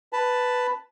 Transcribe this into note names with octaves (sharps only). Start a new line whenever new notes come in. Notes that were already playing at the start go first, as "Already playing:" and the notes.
B4 A5